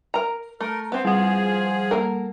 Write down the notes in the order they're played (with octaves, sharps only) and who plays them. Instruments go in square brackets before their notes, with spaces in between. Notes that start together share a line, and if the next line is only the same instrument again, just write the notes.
[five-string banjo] A#4 A#5
[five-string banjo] A3 [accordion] A#4
[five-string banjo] B3 C4 [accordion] C5
[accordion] F3 G#4 [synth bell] G3 F#5
[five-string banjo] A#3 A4 A#4